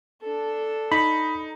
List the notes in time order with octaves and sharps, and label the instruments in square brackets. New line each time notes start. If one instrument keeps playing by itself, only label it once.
[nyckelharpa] D4 A4
[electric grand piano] D#4 [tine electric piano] B5